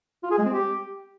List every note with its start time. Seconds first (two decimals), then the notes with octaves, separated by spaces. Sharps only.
0.23 F4
0.31 G#4
0.38 G#3
0.46 C4
0.53 G4